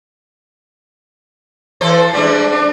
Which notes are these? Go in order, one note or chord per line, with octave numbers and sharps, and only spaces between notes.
E3 A4 C5
G3 G#3 D4
D4